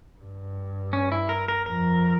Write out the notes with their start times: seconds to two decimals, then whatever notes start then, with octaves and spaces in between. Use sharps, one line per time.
0.19 G2
0.93 C#4
1.12 E4
1.29 A#4
1.48 A#4
1.66 F2 A#4